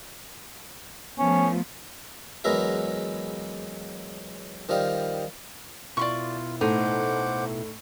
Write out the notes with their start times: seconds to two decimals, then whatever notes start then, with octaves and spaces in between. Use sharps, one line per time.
1.19 F3 A3 B3 C#4
2.44 E2 F#3 G#3 A#4 B4 E5
4.69 D#3 F3 G3 F5 D#6
5.97 B2 E4 F4 D5 C6 C#6
6.61 A2 D#4 C5 F#5 D6